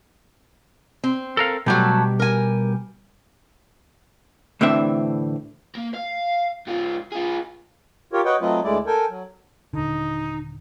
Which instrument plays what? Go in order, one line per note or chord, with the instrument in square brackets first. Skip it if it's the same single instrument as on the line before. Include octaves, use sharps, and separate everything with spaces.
[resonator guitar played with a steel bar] C4
[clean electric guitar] A4 A#4 F5
[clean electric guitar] B2 G3 G4 [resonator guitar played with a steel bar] F#3 A3 A4
[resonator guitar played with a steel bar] A#4 G#5
[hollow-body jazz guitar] D2 A2 E3 C4 D4 E5
[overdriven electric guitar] A#3
F5
G#2 F4
F4 G#4
[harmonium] F4 G4 A#4 C#5
F#4 B4 C#5 D#5 F#5 G5
F#3 A3 C4 F4 B4 D#5
D2 G#3 A3 E4 D5
A4 A#4 G5 G#5
F#3
[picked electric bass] D#1 D3 [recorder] D#4